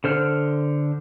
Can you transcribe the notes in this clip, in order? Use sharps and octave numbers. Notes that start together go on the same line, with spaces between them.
D3 C5 F6